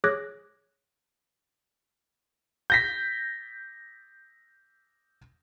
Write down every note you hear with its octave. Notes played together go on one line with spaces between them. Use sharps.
G#4 C#5 D6 F#6 G#6 A#6
G6 A#6 B6